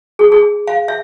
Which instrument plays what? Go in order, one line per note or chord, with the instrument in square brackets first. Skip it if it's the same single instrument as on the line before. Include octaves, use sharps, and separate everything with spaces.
[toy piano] G#4
G#4
F5
E5